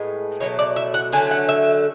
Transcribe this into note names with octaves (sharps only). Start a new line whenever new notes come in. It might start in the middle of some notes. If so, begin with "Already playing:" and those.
Already playing: A2 G#3 B3
B2 F#3 A3 C#5
D5
E5
F#5
D3 F#3 A3 G#5
F#5
E5